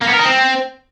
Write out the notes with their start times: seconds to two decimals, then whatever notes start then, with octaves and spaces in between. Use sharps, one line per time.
0.02 A#3
0.08 B3
0.14 A#4
0.20 D#4
0.25 C4